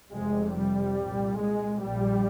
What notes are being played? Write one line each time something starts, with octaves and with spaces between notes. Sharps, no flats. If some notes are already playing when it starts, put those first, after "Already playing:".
F1 F2 C3 G#3
G3
C2 A#2
G#3
A#1 A#2 G3